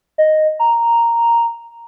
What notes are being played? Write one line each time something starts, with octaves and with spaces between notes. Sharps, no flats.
D#5
A#5